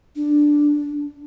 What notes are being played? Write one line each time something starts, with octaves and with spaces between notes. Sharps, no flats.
D4